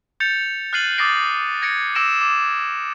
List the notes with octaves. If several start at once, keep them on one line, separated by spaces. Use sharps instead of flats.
G6 A6 C#7 F7
F6 F#6 A6 C7 D#7 F#7
D6 D#6 A6 A#6 C7 D7
G#6 A#6 C#7 D7
D6 E6 A#6 D7 E7
D6